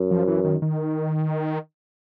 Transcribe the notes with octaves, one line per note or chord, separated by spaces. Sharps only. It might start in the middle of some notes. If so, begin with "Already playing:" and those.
Already playing: F#2
F3
E3
D#3
D#3